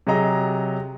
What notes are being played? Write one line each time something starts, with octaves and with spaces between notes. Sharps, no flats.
C3 F#3 G#4 D#5 A#5